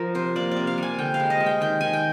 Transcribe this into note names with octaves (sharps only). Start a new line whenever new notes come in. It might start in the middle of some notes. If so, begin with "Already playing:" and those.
Already playing: F3 A#4
C3 C5
A#3 D5
D5
C3
F5
G3 G#5
D3 G5
F5
G#3
D#5
G#3
G5
D#3 G5
D#3 G#5
G5